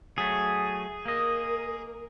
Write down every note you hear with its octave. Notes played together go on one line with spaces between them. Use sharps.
F#3 A3 G#4
A#3 A#4 D#5